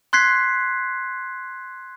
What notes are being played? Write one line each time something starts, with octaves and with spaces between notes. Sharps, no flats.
C6 F#6 G#6 B6 C7